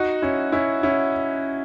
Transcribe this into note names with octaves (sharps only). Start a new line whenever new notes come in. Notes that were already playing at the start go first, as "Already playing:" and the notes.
Already playing: D#4 F#4
C#4 E4
C#4 E4
C#4 E4